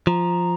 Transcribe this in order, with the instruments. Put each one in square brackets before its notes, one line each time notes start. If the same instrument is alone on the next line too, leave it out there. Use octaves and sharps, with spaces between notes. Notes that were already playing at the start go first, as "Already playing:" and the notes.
[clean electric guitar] F3 [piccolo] A#5